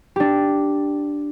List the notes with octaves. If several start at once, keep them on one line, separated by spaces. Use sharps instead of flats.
D4 G4